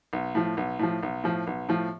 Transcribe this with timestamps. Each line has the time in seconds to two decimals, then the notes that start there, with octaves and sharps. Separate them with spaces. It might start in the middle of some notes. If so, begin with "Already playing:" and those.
0.13 B1
0.35 A2 F3
0.57 B1
0.79 A2 F3
1.03 B1
1.24 A2 F3
1.47 B1
1.69 A2 F3